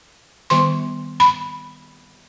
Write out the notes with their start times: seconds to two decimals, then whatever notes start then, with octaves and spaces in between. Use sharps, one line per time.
0.50 D#3 G3 B3 C6
1.20 B5